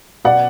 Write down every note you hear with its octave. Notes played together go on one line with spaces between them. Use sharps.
B2 B3 D5 F#5